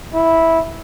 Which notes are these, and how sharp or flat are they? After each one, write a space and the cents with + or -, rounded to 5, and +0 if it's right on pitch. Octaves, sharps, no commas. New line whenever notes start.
E4 -10